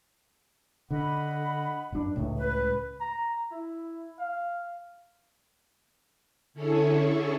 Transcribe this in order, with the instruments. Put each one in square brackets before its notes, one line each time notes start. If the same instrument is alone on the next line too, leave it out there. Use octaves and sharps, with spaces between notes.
[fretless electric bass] D3 [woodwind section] D#5 F#5 B5
[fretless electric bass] F#2 D4
C#2 A2
[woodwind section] B4
[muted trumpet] A#5
E4
F5
[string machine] D3 C#4 E4 G#4 A4 C#5